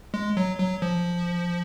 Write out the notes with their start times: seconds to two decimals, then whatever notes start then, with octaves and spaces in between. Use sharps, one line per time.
0.14 G#3
0.37 F#3
0.59 F#3
0.82 F3